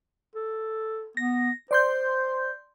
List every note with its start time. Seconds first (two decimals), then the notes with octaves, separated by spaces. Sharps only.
0.35 A4
1.17 B3 A#6
1.71 C5 D5 C6 G6